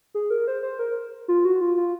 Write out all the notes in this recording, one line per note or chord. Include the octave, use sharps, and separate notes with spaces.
G#4
A#4
C5
C5
A#4
F4
F#4
F4
F4